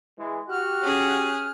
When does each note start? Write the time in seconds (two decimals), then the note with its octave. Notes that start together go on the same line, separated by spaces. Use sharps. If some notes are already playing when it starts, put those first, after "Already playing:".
0.17 E3 G#3
0.49 F#4 G4 F6 F#6
0.81 C#4 G#4